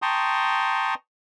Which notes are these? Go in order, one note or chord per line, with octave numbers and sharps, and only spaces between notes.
G5 A5 A#5 C6 C#6 D#6